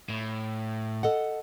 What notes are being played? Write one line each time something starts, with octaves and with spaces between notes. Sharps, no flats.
A2
A4 D#5 F#5